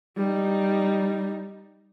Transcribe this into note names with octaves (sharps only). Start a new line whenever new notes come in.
G3 D#4